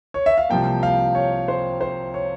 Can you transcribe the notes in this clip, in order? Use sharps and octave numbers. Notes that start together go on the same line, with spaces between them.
C#5
E5
F5
C2 C3 F3 A#3 G5
F5
C#5
C5
C5
C#5